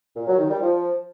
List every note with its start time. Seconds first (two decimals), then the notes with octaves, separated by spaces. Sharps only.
0.15 A#2
0.27 F#3
0.38 D#3
0.49 G3
0.60 F3